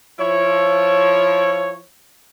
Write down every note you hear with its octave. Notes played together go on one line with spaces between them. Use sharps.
F3 E4 C#5